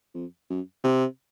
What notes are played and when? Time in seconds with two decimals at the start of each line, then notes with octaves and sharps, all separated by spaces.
0.14 F2
0.50 F#2
0.84 C3